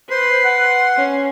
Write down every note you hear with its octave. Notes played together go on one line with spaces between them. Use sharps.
B4 C5 C6
F#5
C#4